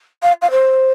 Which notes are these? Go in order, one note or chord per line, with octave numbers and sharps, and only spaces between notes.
F5
F5
C5